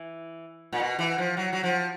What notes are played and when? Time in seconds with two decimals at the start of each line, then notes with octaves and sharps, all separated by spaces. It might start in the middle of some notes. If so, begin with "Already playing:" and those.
Already playing: E3
0.72 A#2
0.80 B2
0.99 E3
1.18 F3
1.37 F#3
1.53 F#3
1.63 F3